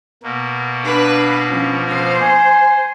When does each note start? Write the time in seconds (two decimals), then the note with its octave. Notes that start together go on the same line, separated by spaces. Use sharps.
0.23 B2 A#3
0.83 D4 B4 F5 B5
1.48 F3 C#4
1.88 C5
2.21 G#5